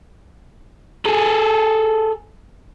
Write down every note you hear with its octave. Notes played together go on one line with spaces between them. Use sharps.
G#4 A4